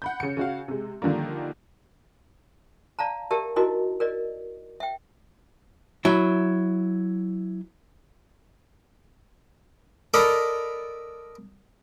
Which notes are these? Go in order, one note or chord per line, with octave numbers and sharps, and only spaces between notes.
F#5 B5 G6
C#3 C#7
C#3 F#4 F5
C3 G#3
D3 D#3 F3 G3 A#3
D5 F5 A5 A#5
G4 A#4 D5 E5 A5
D#4 E4 F#4 A#4 D#5
A#4 D5 D#5
E5 G5
F#3 E4
A4 A#4 D5 D#5 A#5 B5